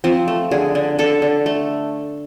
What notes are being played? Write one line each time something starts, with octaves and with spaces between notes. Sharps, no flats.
F3 C4
A3
D3 G#4
D3
D3 A4
D3
A3